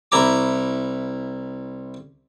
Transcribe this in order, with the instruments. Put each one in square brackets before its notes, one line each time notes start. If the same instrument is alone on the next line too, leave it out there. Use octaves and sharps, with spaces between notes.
[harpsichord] C2 E4 A#5 D6